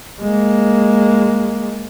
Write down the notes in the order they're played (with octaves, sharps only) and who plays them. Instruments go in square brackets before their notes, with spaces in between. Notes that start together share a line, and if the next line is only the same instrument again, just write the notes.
[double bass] G#3 A#3